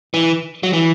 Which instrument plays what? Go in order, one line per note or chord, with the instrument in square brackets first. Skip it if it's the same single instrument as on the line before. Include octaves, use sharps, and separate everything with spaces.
[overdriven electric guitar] E3
F#3
E3